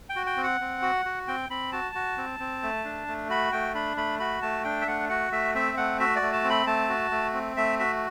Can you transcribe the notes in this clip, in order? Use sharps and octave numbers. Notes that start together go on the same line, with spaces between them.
G5
F#4
G5
C4
F#5
C4
F#4
F#4
C4 G5
C4 B5
F#4 A5
F#4
C4
C4
A3
D4
A3
F#4 B5
A3 G5
D4 B5
A3 B5
F#4 B5
A3 A5
D4 G5
E5
A3 F#5
F#4 F#5
A3 E5
C4 E5
A3 F#5
F#4 E5
D5
A3
A5
C4
B5
A3 A5
F#4
A3
C4
A3 E5
F#4 E5